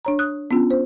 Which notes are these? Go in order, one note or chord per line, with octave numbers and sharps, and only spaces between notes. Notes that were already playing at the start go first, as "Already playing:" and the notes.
D4 C#5 A#5
D#6 F#6
B3 C#4 D4 F4
C5